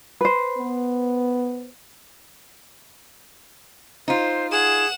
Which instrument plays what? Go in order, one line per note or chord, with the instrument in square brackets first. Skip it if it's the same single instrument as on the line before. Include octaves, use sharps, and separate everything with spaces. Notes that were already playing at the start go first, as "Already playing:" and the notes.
[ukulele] B4 C5
[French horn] B3
[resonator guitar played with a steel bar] D#4 F4 [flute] C5
[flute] G#4 [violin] F#5 E7